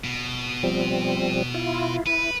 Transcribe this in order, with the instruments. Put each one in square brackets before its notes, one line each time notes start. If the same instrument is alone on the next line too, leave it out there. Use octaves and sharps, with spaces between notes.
[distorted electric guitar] B2
[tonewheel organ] F3 G3 C4
E4 F4
[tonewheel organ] E4 [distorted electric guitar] B4